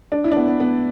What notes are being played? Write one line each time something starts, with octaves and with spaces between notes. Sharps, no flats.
D4
E4
D4
B3
B3
B3